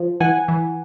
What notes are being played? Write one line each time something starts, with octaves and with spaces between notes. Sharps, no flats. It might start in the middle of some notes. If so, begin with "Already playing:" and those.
Already playing: F3
E3 F#5 G#5
E3